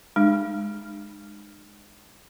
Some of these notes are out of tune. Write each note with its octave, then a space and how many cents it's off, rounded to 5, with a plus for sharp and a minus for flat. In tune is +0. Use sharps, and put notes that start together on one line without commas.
G#3 -5 D#4 -45